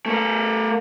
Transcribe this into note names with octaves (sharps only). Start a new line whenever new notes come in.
A3 A#4